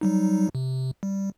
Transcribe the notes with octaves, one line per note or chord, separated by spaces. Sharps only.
F#3 G3 D#4
C3
G3